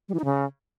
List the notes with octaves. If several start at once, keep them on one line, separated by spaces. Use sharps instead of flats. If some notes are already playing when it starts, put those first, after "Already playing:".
G3
E3
D#4
C#3